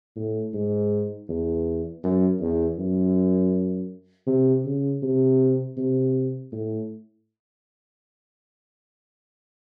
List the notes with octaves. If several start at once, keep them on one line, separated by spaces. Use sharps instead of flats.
A2
G#2
E2
F#2
E2
F#2
C3
C#3
C3
C3
A2